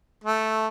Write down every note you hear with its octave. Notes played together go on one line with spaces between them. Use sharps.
A3